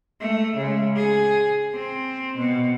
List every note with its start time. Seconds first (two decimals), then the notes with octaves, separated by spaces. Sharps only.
0.20 A3
0.56 C#3 G#3
0.96 G#4
1.74 C4
2.37 B2